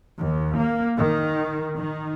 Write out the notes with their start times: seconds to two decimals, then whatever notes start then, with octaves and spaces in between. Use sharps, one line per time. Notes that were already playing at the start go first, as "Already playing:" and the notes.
0.18 D#2
0.57 A#3
0.97 D#3
1.76 D#3